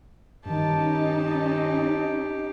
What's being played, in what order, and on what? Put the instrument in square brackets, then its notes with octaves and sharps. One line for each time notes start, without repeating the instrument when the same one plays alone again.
[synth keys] G2 D#3 [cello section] C#4 D#4 [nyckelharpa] G4 [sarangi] A5